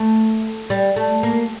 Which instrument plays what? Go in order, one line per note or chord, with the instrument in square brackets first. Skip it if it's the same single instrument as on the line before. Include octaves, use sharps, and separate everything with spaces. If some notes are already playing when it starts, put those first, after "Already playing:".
Already playing: [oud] A3
G3
A3
A#3